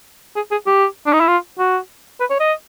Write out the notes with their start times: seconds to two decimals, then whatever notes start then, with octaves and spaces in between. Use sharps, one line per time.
0.36 G#4
0.51 G#4
0.66 G4
1.06 D4
1.13 D#4
1.20 E4
1.28 F4
1.59 F#4
2.20 B4
2.30 C#5
2.40 D#5